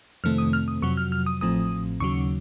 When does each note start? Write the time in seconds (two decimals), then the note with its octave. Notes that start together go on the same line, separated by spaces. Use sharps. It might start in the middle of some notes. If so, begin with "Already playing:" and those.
0.24 F2 C3 D#3 A3 C4 F6
0.38 D#6
0.53 F6
0.68 D#6
0.82 F2 C3 F#3 C#6
0.97 F6
1.12 F6
1.26 D#6
1.41 A1 A2 F3 C4 D#6
2.00 D#2 C#3 F#3 C#6